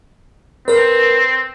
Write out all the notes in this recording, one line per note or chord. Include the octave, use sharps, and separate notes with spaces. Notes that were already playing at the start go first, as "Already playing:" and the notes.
C4 A#4 B4